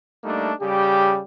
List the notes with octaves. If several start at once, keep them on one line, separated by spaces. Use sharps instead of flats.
G3 A3 A#3 D4 D#4
C#3 G3 G4